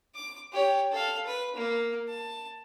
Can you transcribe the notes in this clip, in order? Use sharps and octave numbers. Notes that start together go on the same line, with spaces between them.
D6
G4 C#5
A4 F5
B4
A#3
A5